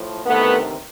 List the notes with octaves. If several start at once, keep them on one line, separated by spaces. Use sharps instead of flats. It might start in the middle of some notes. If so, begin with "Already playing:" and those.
Already playing: A2 F3
D2 C3 D#3 A3 B3